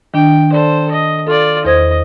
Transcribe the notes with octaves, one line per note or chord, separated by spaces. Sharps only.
D#3 D4 G5
A4 C5 D5
D#5
F4 A4 D5
E2 C5 D#5 G#6